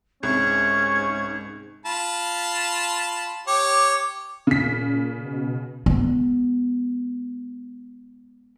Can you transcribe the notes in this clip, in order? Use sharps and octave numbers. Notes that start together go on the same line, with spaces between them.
C2 G#2 C#4 G#6
F4 A5 B5
G4 C#5 D6
A#2 C#3 B6
B2
G#3 B3